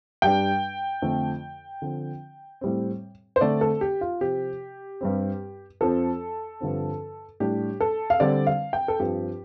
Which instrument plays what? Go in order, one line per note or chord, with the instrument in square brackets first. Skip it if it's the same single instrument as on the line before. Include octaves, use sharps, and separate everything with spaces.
[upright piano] G2 G3 D4 G5
F2 D3 F3 A3
D3 F3 C4
A2 G3 C4
C5
D3 A3 C4 D5
A4
G4
F4
C3 F3 C4 G4
G2 G3 C4
F2 F3 C4 A4
G2 D3 F3 C4
A2 G3 D4 G4
A4
F5
D3 G3 C4 D5
F5
G5
A4
G2 F3 C4 G4